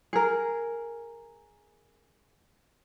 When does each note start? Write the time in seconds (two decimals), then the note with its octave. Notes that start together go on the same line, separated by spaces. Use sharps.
0.13 G#4 A#4